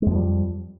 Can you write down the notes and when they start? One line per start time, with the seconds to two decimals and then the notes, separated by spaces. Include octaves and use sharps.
0.02 G#3
0.06 F2
0.11 F3
0.15 G3